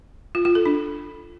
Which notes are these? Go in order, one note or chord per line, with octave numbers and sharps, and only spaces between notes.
F4
F4
A4
D4